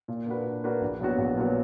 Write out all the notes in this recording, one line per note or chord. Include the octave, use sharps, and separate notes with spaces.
A#2
A#3 D4 F#4 B4
A#2
A#3 D4 F#4 B4
A#1
A#2 F#3 B3 F#4
A#1
A#2 F#3 B3 F#4